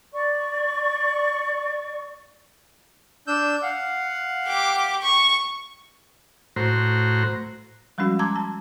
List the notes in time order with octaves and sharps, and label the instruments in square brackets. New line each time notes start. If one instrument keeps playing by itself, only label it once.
[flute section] D5 C#6
[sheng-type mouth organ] D4 E6 G6
F5 F#5
[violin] G4 D6
C#6
[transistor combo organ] A2 F#4 C5 A#5
[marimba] F3 G3 G#3 C#4 F#4
A5 A#5 C6 D6 E6 G#6
A5